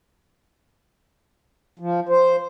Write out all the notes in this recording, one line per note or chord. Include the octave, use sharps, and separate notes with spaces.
F3
C5